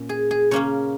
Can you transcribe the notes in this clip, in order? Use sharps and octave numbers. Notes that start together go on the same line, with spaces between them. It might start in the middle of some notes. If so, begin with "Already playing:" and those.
Already playing: A#2 C#4
G#4
G#4
C#3 A#3 C#4 C#5